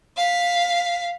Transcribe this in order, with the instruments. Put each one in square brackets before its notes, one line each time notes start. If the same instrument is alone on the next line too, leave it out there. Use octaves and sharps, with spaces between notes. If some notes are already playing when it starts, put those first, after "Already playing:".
[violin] F5 B6